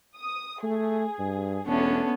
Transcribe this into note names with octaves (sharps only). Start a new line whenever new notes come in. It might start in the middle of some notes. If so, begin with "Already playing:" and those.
D#6
A3 G#4
G2
E1 A3 B3 C#4 D4